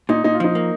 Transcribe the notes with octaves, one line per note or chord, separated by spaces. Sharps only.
A#2 D#4
A#2 D#4
F4
F3 D#4
A#3